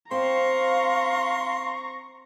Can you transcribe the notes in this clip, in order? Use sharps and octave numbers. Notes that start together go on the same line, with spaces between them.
C4 F5 A#5 C6 C#6